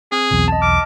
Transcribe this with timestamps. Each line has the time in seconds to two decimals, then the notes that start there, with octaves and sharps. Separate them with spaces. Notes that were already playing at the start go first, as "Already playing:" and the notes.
0.12 C4 G#4
0.31 B1 E2
0.48 D#5 A5
0.62 D6 F6